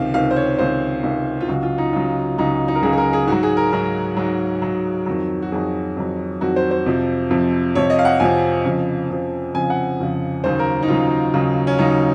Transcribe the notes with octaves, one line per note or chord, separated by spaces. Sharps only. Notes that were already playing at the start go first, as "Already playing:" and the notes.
Already playing: C#2 C3 D#3 F5
C#2 C3 D#3 F5
C5
C#5
C#2 C3 D#3 C5
C#2 C3 D#3
F4
C#2 C#3 F#3 F#4
F4
D#4
C#2 C#3 F#3 F4
C#2 C#3 F#3 D#4
D#4
A#4
C#2 C#3 F#3 G#4
G#4
A#4
G#4
G#2 F#3 F#4
G#4
A#4
G#2 F#3 A#4
G#2 F#3
G#2 F#3
F2 D#3 F#3
F#4
F2 D#3 F#3 G#4
F2 D#3 F#3
F2 D#3 F#3 F#4
C5
C5
F2 C3 F3
F2 C3 F3
F2 C3 F3 C#5
D#5
F5
F#5
F2 C3 F3 G#5
F2 C#3 F3
F2 C#3 F3
F2 C#3 F3 G#5
F#5
F2 C#3 F3
D#2 C#3 F#3 C5
A#4
D#4
D#2 C#3 F#3 F4
D#2 C#3 F#3
C#4
D#2 C#3 F#3 D#4